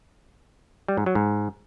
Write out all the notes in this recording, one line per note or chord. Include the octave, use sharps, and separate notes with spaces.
G3
G#2
F#3
G#2